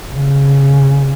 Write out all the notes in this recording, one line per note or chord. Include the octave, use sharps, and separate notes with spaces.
C#3